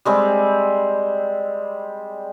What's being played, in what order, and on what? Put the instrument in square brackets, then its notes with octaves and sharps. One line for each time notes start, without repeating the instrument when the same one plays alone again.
[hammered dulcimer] G3 G#3 C4